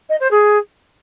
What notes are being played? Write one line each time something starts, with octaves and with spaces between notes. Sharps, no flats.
D#5
C5
G#4